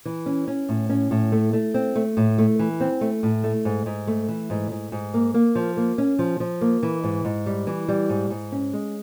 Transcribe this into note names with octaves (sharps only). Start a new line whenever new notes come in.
E3
C#4
C#4
A2
C#4
A2
A3
A3
C4
A3
A2
A3
E3
C4
A3
A2
A3
G#2
G#2
A3
E3
G#2
G#2
G#2
A#3
A#3
F3
A#3
C#4
F3
F3
A#3
E3
G#2
G#2
G3
E3
G3
G#2
G#2
C#4
G#3